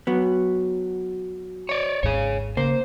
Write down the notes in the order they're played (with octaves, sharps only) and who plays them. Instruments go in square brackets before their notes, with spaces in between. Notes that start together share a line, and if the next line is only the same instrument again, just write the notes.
[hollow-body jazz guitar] F#3 B3
[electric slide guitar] C#5 D5
[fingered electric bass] G#1 D#2 G#2 [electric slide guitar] G#4 C#5
[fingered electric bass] C#3 [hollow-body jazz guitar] A#3 [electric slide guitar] C5